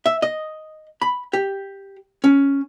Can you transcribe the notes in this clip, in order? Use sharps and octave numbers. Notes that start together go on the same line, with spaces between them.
E5
D#5
B5
G4
C#4